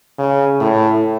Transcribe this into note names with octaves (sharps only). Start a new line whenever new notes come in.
C#3
A2